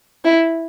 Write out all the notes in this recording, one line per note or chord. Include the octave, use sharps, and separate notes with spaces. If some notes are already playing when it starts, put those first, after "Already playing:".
E4